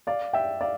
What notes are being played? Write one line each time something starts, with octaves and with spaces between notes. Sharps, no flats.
D5 F5
E5 G5
D5 F5